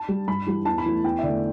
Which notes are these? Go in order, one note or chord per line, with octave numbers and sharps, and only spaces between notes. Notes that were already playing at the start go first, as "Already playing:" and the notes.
Already playing: A5
G3
G2 B5
E3 G3
E2 A5
B5
E3 A3
E2 G5
E5
D3 A3 D5